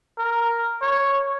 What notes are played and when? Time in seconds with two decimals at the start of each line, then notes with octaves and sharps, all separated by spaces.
0.18 A#4
0.82 C#5